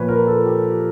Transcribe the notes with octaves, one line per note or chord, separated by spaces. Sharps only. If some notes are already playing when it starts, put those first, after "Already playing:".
Already playing: A#2 F3 B4 C#5
A#4
A4
G4